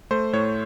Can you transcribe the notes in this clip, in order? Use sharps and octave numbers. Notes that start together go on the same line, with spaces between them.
A3 C5
A2 C#5